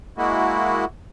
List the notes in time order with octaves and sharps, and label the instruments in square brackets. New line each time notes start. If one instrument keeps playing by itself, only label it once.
[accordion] G#3 A#3 E4 F#4